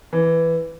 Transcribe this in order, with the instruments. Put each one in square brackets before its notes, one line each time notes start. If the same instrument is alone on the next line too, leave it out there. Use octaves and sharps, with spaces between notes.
[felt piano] E3